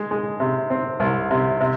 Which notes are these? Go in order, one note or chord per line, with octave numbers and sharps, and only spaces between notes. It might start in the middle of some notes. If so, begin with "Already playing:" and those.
Already playing: G#3
G#3
C3
C4
C2
C3
C3